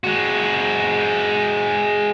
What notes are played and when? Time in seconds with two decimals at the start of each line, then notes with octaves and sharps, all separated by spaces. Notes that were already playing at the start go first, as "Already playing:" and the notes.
0.04 G#3 F#4